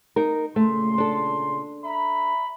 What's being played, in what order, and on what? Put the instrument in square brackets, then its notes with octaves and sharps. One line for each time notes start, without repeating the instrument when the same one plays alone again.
[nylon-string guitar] D#4 A#4
[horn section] A#2 C#3 C6 [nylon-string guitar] A3
[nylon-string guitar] D4 A4
[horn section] E5 A#5 B5